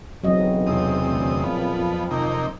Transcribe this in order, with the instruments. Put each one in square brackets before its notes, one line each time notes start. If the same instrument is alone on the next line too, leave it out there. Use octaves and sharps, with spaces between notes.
[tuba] B1 [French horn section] C#3 E3 C4 [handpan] F#3 D#5
[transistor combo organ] E2 C3 D#6
[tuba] D2
[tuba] A#2 [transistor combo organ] F3 B3
[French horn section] F2
[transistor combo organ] C3 A#3 D#4 [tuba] D#3